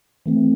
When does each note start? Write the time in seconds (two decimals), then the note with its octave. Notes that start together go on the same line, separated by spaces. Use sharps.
0.26 E3 A3 C4